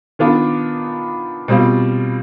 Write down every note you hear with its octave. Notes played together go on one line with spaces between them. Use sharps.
D#3 B3 D4 F4
B2 G3 C4 F4